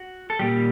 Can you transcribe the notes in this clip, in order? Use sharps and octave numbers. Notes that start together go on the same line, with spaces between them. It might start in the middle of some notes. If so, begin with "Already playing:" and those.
Already playing: F#4
A4
A#2 G3 G4